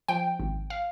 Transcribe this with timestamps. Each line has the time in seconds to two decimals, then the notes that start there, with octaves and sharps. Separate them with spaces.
0.08 F3 G5
0.40 G#1
0.70 F5